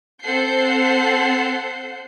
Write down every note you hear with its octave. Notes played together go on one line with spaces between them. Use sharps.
C4 A4 F#5 G6 C7